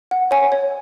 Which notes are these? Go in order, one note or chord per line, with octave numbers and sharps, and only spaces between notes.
F#5
C#5 G#5
C#5